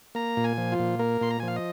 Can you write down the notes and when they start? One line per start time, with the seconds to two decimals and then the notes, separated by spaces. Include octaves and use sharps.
0.15 A#3 A#5
0.37 A#2
0.44 G#5
0.57 F3
0.72 F4
0.79 A#2
0.99 A#3 A#4
1.21 A#2 C6
1.30 A#5
1.40 F3 G#5
1.48 F5
1.56 D#5